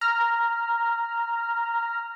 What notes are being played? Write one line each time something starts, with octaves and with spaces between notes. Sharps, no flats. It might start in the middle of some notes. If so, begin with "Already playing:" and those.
A#5 F6